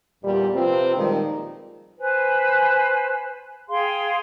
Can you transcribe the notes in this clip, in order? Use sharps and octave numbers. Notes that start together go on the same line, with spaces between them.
E2 A#2 G3
C3 F3 C4 F4 B4
A#2 D#3 F3 G3 G#3
B4 C5 G#5
G#4 F5 G5 C6